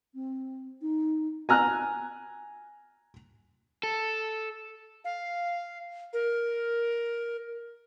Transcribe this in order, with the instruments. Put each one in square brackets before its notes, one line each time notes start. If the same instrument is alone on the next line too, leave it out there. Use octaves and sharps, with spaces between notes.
[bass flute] C4
D#4
[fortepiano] G#5 A#5 F6 F#6
[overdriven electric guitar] A4
[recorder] F5
A#4